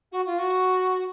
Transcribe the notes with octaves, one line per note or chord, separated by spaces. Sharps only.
F#4
F4
F#4